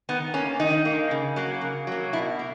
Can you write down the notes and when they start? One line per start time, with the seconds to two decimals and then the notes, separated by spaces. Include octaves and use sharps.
0.09 D#3 B3
0.34 A#3 C#4
0.60 D#3 D#4
0.85 A#3
1.11 C#3
1.36 F#3 A#3
1.61 C#3
1.87 F#3 A#3
2.13 B2 E4
2.39 A#3